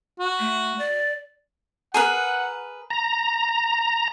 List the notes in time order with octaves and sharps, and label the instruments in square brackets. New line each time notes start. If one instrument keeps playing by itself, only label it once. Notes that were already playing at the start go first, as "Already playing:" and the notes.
[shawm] F#4
[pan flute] A3
D5
[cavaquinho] G#4 A#4 B4 [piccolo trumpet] F#5
[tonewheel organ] A#5